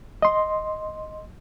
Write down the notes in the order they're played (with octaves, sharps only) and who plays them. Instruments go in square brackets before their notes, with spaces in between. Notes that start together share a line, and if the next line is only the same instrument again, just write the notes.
[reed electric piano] D#5 C6